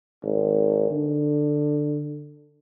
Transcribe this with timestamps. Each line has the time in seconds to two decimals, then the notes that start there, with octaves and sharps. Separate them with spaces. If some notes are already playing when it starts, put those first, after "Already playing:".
0.23 G#1
0.91 D3